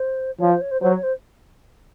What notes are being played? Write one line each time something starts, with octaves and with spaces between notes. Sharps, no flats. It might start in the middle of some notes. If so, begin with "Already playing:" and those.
Already playing: C5
F3 C#5
C5
C#5
C5
F#3 C5
C#5
C5